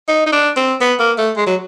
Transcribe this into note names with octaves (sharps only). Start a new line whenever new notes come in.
D#4
D#4
D4
C4
B3
A#3
A3
G#3
F#3